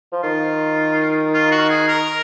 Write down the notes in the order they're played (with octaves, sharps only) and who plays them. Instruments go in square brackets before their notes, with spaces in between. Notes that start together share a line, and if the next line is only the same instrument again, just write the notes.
[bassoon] F3
[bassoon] D#3 [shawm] F4
[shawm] F4
F#4
G#4
A#4